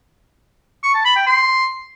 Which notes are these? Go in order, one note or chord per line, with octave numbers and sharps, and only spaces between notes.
C#6
A5
B5
G5
C6